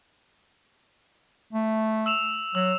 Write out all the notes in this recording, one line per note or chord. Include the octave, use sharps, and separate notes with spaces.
A3
E6 E7 F7
F#3 E6